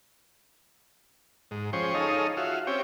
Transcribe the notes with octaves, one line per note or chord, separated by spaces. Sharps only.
G#2
F3 C#4 G#4 C5 G5 C#6
D#4 G#4 A4 C#5 D#5 F5
F4 F#4 E5 F5
C4 C#4 G4 C#5 G5